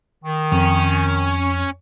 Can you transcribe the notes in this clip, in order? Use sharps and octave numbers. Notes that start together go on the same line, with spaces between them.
D#3
F2 C#4